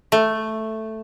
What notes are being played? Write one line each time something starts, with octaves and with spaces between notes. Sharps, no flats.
A3